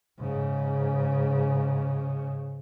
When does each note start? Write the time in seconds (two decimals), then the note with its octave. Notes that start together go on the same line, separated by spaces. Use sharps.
0.20 G#2 C#3